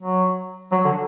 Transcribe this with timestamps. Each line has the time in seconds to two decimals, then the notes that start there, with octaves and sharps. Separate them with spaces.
0.02 F#3
0.72 F#3
0.85 D3